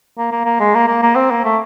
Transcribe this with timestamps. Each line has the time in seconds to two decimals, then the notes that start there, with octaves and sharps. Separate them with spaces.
0.18 A#3
0.32 A#3
0.45 A#3
0.60 G#3
0.75 A#3
0.88 A#3
1.03 A#3
1.16 C4
1.31 A#3
1.44 A3